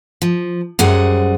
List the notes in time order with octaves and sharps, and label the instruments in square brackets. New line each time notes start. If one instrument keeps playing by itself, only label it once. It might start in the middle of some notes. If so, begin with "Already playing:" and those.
[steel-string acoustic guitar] F3
F#2 G3 G#4 C5 F#5